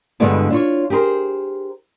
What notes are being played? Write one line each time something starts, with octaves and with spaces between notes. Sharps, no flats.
G2 B2 D3 G#3 B3 D4
D4 F4 C#5
G4 G#4 A#4 C5